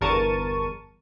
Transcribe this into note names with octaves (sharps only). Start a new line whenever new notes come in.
G1 E2 A#4 A5 C#6 D#7